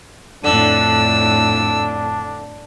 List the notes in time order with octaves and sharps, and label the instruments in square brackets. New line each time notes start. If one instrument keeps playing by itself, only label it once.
[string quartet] F2 A2 [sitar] D3 [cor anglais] D4 [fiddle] E6